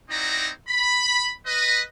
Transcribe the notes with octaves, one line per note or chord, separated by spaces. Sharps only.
C4 D#4 E4 F#4 D5 A#5
B5
B4 D#5